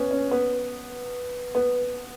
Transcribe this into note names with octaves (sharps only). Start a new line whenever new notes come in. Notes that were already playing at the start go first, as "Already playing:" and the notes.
Already playing: B3 C#4
C#4
B3
B3